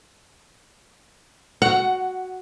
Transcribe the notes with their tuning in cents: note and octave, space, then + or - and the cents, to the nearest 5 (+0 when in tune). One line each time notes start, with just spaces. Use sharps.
F#4 +0 F#5 +15